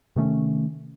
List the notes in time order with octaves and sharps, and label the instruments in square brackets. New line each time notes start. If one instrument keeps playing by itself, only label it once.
[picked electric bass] C3 D#3 A3 C#4